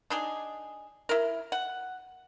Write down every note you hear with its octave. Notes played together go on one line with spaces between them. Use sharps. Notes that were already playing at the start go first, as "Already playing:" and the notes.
D4 D#4 G#4
E4 A#4
F#5